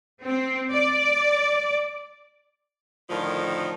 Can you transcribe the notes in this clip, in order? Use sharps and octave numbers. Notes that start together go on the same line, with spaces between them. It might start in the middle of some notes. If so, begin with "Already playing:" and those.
C4
D5
A2 D3 D#3 F3